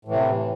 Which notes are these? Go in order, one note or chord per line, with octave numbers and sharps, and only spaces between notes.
A2 C3 E3